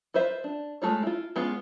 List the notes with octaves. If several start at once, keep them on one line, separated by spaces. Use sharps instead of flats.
F4 B4 C5 E5
D4
G#3 A3 F4 C#5
E4 F4
G#3 B3 C#4 F4